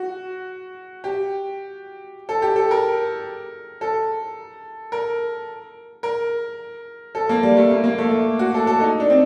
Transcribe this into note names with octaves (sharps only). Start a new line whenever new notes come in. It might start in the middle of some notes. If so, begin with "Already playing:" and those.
Already playing: F#4
G4
A4
G4
A4
A#4
A4
A#4
A#4
A4
A#3
G3
A3
A#3
A#3
A3
A3
F#4
A4
A4
D#4
D4
C4